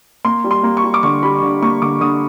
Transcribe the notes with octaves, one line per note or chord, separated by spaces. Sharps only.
A#3 C6
G3
C6
A#3
C#6
G3
D6
D3 C#6
G3 B5
D3
A#3 C#6
D3 D6
D3 D#6